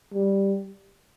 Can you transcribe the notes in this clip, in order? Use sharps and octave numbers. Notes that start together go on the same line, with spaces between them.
G3